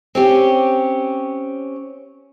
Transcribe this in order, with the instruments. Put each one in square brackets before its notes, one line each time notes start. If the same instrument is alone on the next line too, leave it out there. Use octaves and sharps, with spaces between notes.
[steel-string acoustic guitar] C4 C#4 G4